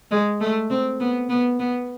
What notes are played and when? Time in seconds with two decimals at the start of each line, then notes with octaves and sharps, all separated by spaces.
0.11 G#3
0.41 A3
0.70 C4
1.00 B3
1.29 B3
1.59 B3